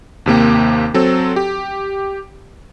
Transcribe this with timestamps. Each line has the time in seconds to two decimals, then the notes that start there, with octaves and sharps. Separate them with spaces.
0.26 D#2 C3 A#3 G4
0.94 F#3 C4 A4
1.36 G4